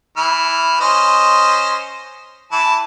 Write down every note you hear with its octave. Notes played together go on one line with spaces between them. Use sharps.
E3 F6
C#4 C5 D#5
E3 A5